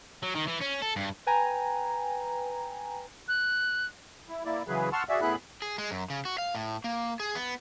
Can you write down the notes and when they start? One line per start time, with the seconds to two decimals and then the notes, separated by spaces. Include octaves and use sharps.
0.23 F#3
0.35 D#3
0.47 E3
0.61 C#4
0.82 A4
0.96 G2
1.26 B4 G5 G#5 A#5
3.28 F#6
4.29 E4
4.45 A#3 E4 D5
4.68 C#3 E3 F#3 G#4 B4
4.93 F#5 A5 C6 C#6 E6 F6
5.09 F#4 G#4 D5 E5
5.21 A2 B3 E4 G#4 B5 F#6
5.62 G#4
5.78 G#3
5.91 F#2
6.10 C#3
6.25 F#4
6.38 F5
6.55 A2
6.84 A#3
7.20 G#4
7.35 B3